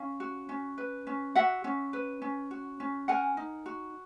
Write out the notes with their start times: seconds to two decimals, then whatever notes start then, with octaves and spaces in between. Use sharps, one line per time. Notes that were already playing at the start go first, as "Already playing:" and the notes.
Already playing: C#4 F5
0.20 F#4
0.49 C#4
0.78 B4
1.07 C#4
1.35 F#4 E5 F#5
1.64 C#4
1.93 B4
2.22 C#4
2.51 F#4
2.80 C#4
3.08 A#4 F#5 G#5
3.37 D#4
3.66 F#4